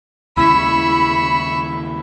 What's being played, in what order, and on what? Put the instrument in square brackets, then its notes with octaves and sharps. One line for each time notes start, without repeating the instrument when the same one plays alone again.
[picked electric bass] D#2 C#3 G#3 [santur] E4 [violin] E5 C#6 [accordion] B5